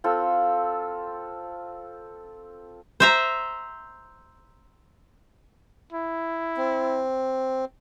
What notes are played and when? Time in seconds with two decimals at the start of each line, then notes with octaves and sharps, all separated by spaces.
0.04 C4 F4 A4
3.00 C5 E5 A#5
5.92 E4
6.57 C4